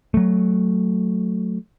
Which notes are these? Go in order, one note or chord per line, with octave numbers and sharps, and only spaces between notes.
F#3 A3